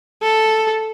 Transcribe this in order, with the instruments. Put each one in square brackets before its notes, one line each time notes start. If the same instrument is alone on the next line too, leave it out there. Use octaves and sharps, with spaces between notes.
[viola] A4